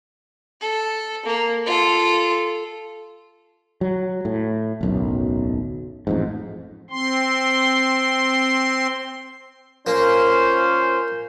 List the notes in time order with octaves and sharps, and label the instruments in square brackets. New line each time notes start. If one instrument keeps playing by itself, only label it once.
[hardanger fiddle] A4
A#3
F4 A4
[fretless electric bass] F#3
A2
D1 B1 F#2
A1 F2 G#2
[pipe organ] C4 C6
[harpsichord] A#3 [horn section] C#4 F4 C5